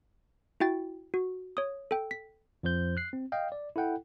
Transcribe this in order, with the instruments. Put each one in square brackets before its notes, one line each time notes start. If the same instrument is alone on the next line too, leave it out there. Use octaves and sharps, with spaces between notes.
[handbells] E4 F#4 G5 A6
F#4
C#5 D#6
A4 G5
B6
[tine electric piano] F2 F3 C5 G6
F#6 C7
C4
D#5 F5 G5
D5
E4 A4 F#5 G5